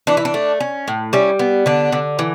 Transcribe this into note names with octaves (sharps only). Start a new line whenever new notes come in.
E3 D4
E4
D4
A3
C#4
A2
G3 C#4 E4
B3
D3 D4
D3
E3